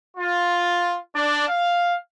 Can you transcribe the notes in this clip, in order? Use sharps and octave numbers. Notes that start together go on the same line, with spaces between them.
F4
D4
F5